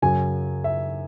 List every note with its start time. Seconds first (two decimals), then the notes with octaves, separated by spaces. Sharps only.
0.02 F#2 C#3 F#3 G#5
0.64 E5